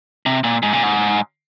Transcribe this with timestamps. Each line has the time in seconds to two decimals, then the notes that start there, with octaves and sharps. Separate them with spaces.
0.26 C3
0.44 A#2
0.63 G#2
0.73 A#2
0.83 G#2